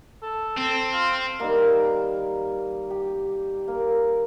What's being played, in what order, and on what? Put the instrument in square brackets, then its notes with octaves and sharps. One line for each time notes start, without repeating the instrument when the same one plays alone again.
[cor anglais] A4
[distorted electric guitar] C4 [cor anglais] A4
[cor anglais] F4
[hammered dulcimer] D#3 G3 A#3
G4
A#3